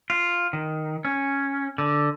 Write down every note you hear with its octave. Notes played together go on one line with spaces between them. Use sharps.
F4
D#3
C#4
D3